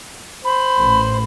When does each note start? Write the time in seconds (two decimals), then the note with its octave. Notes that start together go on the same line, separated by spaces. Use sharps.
0.45 C5 B5
0.78 A1